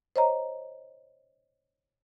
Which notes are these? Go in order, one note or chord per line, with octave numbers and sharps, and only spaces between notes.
C5 C#5 D#5 A#5